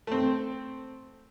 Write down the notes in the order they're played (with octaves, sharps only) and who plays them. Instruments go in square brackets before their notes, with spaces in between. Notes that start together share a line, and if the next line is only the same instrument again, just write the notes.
[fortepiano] A3 C4